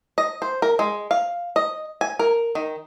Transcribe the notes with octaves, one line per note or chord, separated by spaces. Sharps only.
D#5
C5
A#4
G#3
F5
D#5
G#5
A#4
D#3